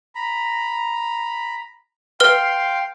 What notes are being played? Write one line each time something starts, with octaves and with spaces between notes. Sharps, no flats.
A#5 B5
B4 F5 G5 C6 F6 G7